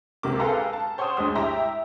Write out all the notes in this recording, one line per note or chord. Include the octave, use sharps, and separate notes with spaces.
C#2 C3 A#3 D6
G#4 A4 B4 F5 G5 A#5
A5
C5 C#5 F#5 G5 C6 D#6
D2 G2 G#3 D#6
E4 G4 E5 G5 A#5